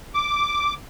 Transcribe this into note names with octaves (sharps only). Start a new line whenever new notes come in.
D6